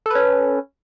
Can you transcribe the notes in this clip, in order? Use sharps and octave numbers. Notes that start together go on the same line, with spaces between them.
C#4 A4 B4